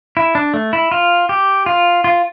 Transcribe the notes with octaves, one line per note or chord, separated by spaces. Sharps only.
E4
D4
A3
E4
F4
G4
F4
F4